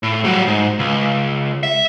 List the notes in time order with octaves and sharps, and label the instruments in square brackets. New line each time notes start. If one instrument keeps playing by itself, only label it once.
[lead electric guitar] A2
F#3 G3
G#2
C#2
E5